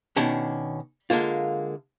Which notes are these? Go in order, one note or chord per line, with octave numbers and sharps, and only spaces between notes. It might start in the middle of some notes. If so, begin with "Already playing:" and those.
B2 D#3 C#4 D4
D3 G#3 A#3 F4